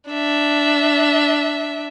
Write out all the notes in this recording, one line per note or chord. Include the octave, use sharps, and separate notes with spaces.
D4 E5